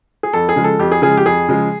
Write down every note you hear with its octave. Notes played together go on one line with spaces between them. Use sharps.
G#4
F2 A4
G#4
C#3 F3 G#3
A4
F2 G4
G#4
C#3 F3 G#3 G#4
G4
F2 G#4
C#3 F3 G#3